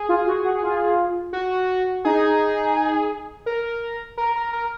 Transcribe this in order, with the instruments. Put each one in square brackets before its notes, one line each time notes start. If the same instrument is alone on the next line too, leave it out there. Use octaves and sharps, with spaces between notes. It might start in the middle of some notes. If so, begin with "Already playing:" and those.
Already playing: [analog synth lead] G#4
[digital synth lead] F4
F#4
F#4
F4
[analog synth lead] F#4
[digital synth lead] D#4 [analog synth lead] G#4
[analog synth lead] A#4
A#4
A#4
A#4